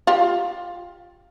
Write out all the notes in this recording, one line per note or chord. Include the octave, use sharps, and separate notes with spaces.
F4 G4